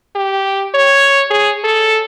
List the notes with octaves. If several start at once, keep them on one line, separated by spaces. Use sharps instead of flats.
G4
C#5
G#4
A4